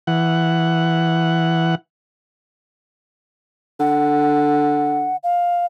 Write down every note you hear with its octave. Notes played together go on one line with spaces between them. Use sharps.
E3 F#5
D3 F#5
F5